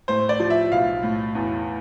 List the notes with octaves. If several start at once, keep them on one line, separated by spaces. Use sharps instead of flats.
A2 C5
D5
F3
E5
B1 F5
A2
E2